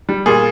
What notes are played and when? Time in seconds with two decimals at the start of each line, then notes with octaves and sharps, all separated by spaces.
0.09 G3
0.26 A#2 G#4